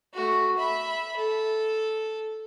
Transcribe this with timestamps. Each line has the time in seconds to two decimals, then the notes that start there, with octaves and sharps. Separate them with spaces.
0.14 A3 F#4
0.57 E5 B5
1.17 A4